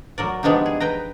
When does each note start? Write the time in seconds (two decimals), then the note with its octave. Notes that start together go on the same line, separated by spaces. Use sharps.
0.18 F#3 A#4 D5
0.43 F3 G#3 B3 D4 D#4 G4
0.66 G#4
0.80 B4 G5 A#5